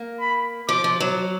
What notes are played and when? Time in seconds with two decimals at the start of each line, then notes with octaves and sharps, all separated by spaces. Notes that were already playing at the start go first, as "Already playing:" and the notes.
Already playing: A#3
0.20 B5
0.68 F3 D6
0.84 F3
1.00 F#3